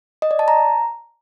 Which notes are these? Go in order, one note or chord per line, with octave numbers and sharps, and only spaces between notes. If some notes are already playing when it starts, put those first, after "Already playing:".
D#5
D5
A5
A#5